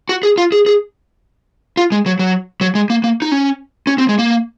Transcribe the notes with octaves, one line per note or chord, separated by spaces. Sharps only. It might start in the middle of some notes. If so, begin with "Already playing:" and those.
F#4
G#4
F4
G#4
G#4
F4
G#3
F#3
F#3
F#3
G#3
A#3
A#3
D#4
C#4
C#4
C4
G#3
A#3